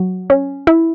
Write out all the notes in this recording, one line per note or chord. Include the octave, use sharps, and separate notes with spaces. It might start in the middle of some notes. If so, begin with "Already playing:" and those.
Already playing: F#3
C#4
E4